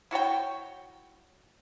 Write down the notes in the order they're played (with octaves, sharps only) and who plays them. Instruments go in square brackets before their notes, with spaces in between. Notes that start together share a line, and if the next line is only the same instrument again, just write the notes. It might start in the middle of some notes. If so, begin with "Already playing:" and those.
[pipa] E4 F#4 C#5 G5